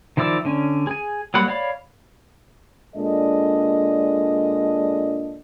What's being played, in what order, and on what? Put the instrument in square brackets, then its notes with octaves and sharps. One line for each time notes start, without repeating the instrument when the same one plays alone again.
[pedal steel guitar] D#3 F3 E4 D5 E6
D3 C#4
G#4 G#5
F#3 G3 A#3 F#5 B5
C#5 D5 F5 B5
[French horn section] A#2 G#3 D4 A4 D#5